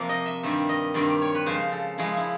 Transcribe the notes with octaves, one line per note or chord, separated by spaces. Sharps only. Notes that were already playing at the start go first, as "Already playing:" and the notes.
Already playing: C3 F3 A#3
D#5
E5
G2 D#3 G3 C4 E5
D#5
G2 D#3 G3 C4 D5
C#5
B4
C#3 F3 G#3 C5
A4
C#3 F3 G#3 E4
E4